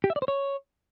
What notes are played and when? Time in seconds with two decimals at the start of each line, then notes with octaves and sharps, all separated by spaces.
0.04 G4
0.10 E5
0.16 D5
0.22 C5
0.28 C#5